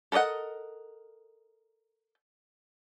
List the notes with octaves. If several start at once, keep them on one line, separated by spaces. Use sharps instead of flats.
A4 A#4 D5 D#5 F#5